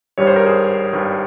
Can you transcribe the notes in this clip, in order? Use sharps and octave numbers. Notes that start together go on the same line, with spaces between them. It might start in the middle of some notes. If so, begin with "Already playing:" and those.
G#1 G2 G3 C#5
C5
A#4
G#4 C5
G#1 G2 G3